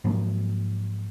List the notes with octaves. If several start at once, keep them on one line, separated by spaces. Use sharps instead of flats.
G#2 F3 F#3 A#3